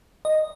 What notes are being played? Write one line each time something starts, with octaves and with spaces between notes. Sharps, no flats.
D#5